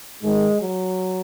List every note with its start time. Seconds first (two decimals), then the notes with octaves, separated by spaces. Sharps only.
0.23 G#2 D#3 G#3
0.59 F#3